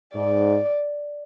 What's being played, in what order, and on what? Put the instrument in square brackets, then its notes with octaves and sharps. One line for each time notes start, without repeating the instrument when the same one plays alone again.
[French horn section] G#2 [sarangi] D5